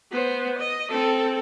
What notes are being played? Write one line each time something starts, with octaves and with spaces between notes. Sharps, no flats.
B3 C5
D#5
C4 A4